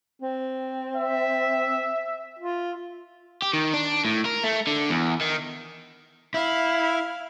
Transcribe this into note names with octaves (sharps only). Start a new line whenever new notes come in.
C4
E5
F4
G4
D#3
D4
A2
A#4
A3
D3
E2
D#3
E4 F5